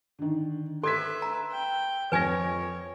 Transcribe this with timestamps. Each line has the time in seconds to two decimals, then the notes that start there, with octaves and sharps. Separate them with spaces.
0.19 D3 D#3
0.83 A4 B4 E5 C6 G#6 B6
1.22 A#5
1.51 G5
2.12 F2 B4 C#5 G#5 G#6 A#6